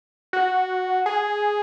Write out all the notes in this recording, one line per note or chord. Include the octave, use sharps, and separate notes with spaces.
F#4
G#4